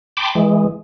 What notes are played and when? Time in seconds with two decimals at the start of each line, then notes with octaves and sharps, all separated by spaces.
0.17 G5 A5 B5 C6 D6
0.35 E3 G#3